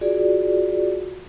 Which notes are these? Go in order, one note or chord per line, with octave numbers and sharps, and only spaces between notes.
F4 F#4 G#4 D5